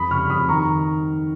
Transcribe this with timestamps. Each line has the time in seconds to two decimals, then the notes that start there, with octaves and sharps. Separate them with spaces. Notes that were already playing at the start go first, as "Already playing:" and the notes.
Already playing: F2 B5 D#6
0.11 C#3 C#6 F6
0.29 F2 B5 D#6
0.48 D#3 A#5 C#6